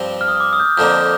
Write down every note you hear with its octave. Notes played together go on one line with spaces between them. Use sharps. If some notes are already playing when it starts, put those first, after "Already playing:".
Already playing: G2 F3 C4
F6
D#6
D6
D#6
G6
F6
F2 D3 F3 A#3 G6